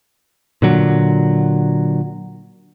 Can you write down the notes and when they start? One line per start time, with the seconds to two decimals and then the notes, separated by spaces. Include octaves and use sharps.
0.62 A#2 D3 F#3